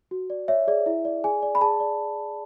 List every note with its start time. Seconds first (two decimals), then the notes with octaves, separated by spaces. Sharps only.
0.11 F#4
0.30 D5
0.48 C#5 E5
0.67 G#4 D5
0.86 E4 E5
1.05 D5
1.24 G#4 G#5
1.42 D5
1.55 B5
1.61 G#4 A5
1.80 D5